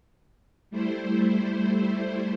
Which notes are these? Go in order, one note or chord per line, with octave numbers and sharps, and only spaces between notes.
G3 A3 E4 C5